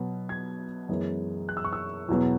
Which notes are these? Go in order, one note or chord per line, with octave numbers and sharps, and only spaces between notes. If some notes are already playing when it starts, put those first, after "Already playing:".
Already playing: B2 F#3 B3
G#6
F#2 E3 G#3 B3
F#6
E6
C#6
E6
E2 B2 F#3 B3